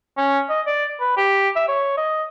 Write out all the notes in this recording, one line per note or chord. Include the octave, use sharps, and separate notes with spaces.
C#4
D#5
D5
B4
G4
E5
C#5
D#5